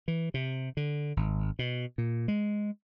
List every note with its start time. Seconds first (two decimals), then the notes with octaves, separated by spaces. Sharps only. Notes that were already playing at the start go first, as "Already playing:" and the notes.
0.08 E3
0.34 C3
0.77 D3
1.17 G#1
1.59 B2
1.98 A#2
2.28 G#3